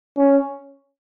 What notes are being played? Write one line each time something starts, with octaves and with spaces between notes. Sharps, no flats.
C#4